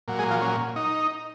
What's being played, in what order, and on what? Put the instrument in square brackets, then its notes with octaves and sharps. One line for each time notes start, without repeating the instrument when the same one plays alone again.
[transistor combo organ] A#2 F#3
G#3 G#4
F3 F4
C#4
D#4